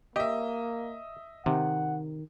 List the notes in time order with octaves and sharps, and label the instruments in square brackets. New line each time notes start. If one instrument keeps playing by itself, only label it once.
[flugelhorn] A#3 [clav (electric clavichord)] G4 [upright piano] D#5 E5
[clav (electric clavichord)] C3 [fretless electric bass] D#3 [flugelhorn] F#5